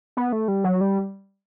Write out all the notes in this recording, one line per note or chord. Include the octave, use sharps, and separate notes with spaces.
B3
A3
G3
F#3
G3